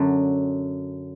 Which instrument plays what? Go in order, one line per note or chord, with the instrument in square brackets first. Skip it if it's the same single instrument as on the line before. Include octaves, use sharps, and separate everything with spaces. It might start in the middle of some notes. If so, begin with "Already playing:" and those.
Already playing: [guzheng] F#2 D3 F#3